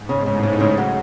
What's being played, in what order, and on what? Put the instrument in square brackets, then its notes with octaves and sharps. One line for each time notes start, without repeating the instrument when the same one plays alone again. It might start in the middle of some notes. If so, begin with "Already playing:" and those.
Already playing: [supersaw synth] G#2
[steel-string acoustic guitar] C#3
[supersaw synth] A2 [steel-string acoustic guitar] C#3
[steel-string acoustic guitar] C#3
[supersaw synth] G#2 [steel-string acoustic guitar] C#3
[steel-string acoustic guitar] F#3